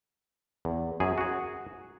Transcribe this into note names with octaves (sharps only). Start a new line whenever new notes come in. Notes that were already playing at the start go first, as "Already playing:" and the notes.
E2
F#2 G#4
F#4 G#4